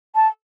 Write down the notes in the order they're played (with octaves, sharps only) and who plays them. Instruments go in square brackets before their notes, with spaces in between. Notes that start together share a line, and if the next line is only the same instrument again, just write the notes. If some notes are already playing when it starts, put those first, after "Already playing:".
[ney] A5